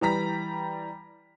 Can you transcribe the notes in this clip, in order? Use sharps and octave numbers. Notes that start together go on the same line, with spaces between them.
E3 G3 A#5 B6